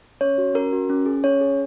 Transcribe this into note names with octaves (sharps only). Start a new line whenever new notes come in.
C#4 C#5
F#4
C#4 A#4
F#4
C#4
G#4
C#4 C#5
G#4